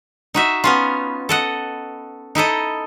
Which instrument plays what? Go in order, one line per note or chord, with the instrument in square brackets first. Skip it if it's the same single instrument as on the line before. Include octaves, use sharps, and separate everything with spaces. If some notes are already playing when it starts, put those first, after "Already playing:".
[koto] D#4 F#4 E5
B3 C#4 F4
A4 D#5 F#5
D#4 E4 A4 D#5